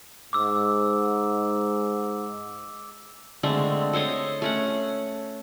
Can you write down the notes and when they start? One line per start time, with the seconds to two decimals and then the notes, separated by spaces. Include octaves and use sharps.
0.33 G#2 D6 E6
3.43 D3 G#3 A3 C4
3.93 A4 C5 C#5 D#5
4.42 A3 C#4 F#5